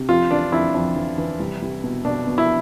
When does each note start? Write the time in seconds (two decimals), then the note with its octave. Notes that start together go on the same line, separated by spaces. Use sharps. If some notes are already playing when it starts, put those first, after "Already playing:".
Already playing: C3
0.09 F2 F4
0.31 E3 D4
0.52 F2 E4
0.74 F2
0.96 E3
1.18 E3
1.40 C2
1.62 C2
1.84 B2
2.05 B2 D4
2.27 B2
2.38 E4